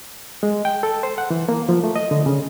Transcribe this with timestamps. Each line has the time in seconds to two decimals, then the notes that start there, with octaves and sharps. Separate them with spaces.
0.43 G#3
0.65 G5
0.83 A4
1.03 C5
1.18 F#5
1.31 E3
1.49 A#3
1.69 F3
1.84 A3
1.96 D#5
2.11 D3
2.26 C#3